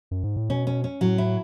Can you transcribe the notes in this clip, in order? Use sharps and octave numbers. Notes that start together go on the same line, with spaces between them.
F#2
G#2
A2
B2 C#4
C#4
C#4
A2 F#3
E4